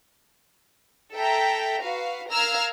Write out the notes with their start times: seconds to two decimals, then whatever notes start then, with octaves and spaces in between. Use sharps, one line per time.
1.13 A4 E5 G5 A#5
1.82 F#4 B4 F5
2.30 A#4 F5 A#5 E6 F6 G#6